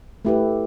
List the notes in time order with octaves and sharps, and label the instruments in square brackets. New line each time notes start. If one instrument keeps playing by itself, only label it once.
[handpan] A3 E4 G4 B4